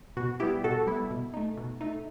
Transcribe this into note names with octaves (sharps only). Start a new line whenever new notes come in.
B2 F#4
G3 B3 E4 G4
B2 F#4 A4
G3 B3 E4
B2
A3 D#4
B2
A3 D#4